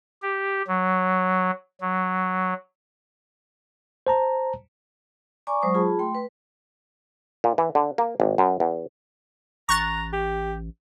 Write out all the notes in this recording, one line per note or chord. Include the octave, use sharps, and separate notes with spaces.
G4
F#3
F#3
C5 A5 A#5
D5 G#5 A#5 C#6 D6
F#3 G#3 C5 C#6 D#6
F4 G#4 A5 B5
A3 G5 C6
B4
A#2
E3
D3
A#3
G#1
F#2
E2
A1 A#5 C#6 F#6 A6
G4